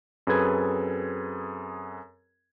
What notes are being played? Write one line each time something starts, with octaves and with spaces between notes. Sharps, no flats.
F#2 C4 G#4 A4 B4 G#6